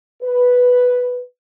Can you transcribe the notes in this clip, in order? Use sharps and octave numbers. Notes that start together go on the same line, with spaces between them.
B4